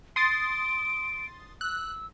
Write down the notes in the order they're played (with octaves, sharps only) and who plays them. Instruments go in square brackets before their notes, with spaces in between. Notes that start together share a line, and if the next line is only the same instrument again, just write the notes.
[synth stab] C6 D#6 A6 [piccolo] D7
[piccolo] E6 [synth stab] F#6